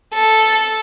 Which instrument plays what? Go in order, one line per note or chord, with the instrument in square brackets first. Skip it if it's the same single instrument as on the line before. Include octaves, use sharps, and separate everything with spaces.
[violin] A4